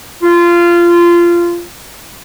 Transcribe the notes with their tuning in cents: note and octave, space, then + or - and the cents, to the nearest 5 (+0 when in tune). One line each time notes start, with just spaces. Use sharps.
F4 -20